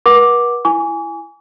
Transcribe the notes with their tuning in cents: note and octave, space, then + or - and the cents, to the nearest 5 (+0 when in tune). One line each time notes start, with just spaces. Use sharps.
B4 -45 F#5 +0 D6 +0
E4 +20 G#5 -5 D6 -45